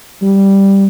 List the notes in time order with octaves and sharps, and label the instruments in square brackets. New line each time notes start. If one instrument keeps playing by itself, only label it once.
[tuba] G3